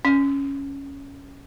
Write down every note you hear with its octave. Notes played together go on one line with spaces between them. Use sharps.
C#4